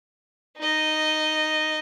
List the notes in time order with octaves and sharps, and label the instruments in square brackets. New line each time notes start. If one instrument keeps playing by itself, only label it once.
[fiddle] D#4 D#5